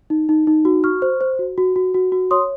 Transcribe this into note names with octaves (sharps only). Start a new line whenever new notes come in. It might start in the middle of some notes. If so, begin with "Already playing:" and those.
D#4
D#4
D#4
F#4
F#4 C#6 F6
C5
C5
F#4
F#4
F#4
F#4
F#4
C#5 C6 D#6